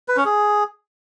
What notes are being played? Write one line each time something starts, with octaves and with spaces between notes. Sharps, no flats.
B4
C#4
G#4